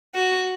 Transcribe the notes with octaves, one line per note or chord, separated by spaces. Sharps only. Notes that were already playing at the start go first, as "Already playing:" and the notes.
F#4